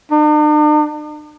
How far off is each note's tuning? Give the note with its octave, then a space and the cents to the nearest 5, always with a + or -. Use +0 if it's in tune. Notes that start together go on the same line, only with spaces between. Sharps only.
D4 +45